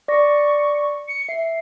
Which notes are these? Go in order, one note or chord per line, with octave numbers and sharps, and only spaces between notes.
D5 C#6 A#6
C#7
E5 C7